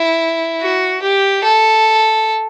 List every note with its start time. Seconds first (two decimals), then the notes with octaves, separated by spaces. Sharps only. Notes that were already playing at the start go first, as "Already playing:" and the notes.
Already playing: E4
0.61 F#4
1.02 G4
1.44 A4